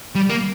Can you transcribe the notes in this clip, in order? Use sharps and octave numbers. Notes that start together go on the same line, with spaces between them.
G3
A#3